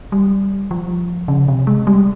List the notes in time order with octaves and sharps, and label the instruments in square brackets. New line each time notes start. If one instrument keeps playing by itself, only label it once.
[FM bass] G3
F3
C#3
C3
G#3
G3